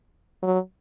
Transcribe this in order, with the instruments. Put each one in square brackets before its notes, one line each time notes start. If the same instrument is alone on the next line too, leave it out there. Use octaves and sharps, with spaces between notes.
[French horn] F#3